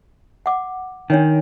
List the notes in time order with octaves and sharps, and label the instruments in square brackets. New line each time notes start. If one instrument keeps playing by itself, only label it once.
[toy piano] F#5 D6
[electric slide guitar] D#3 [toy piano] D4 C#5 G5